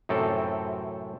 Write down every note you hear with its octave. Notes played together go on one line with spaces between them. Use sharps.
F#2 A2 C3 C4 A4 G5